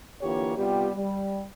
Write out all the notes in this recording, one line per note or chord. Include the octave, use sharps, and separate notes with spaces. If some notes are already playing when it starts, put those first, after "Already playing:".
D3 E3 A#3 F4 G4 C#5
C3 G3 B3 F4 G4
G3